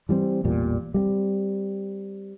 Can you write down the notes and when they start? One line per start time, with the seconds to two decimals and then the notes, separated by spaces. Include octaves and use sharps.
0.09 E3 G3 B3 C4
0.44 A1 E2 A#2 G3
0.94 G3 G#3 C4